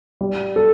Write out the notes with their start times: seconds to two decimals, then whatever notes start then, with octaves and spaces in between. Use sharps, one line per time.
0.21 G3
0.56 A4